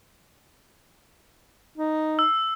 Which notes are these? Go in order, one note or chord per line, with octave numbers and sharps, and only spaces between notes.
D#4
E6